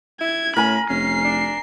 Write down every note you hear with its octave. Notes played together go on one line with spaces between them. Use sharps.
E4 G#6
A2 C#4 A#4 G#5 B5
F1 C#4 C7
D4